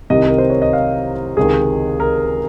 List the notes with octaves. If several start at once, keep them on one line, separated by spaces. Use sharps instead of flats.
C2 C3 D#3 D#5
A#4
C5
C#5
D#5
F5
C#2 C3 D#3 G#4
A#4